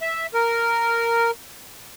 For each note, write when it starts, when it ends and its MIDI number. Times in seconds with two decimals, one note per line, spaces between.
0.01 0.26 76
0.34 1.31 70